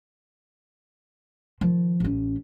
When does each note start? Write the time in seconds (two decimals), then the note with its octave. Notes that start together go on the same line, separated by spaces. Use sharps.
1.61 D#3 F3
2.00 A1 C#4